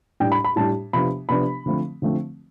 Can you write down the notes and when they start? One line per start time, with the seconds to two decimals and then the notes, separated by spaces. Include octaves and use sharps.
0.20 A2 G3 D4 G5
0.32 B5
0.44 B5
0.56 A2 G3 D4 A5
0.93 C3 F3 B3 D4 B5
1.29 C3 F3 B3 D4 B5
1.66 D3 F3 A3 C4
2.02 D3 F3 A3 C4